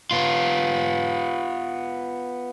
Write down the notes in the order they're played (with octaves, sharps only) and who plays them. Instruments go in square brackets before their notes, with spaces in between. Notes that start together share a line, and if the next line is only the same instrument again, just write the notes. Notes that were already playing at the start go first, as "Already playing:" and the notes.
[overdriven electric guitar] B3 F4